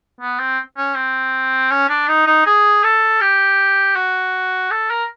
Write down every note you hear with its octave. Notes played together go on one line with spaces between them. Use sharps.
B3
C4
C#4
C4
C#4
D4
D#4
D#4
G#4
A4
G4
F#4
A4
A#4